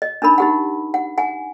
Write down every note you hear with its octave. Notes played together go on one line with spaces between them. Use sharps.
D#5
D4 D#4 A#4 B5
D#4 G4 F#5
F#5
F#5 G#5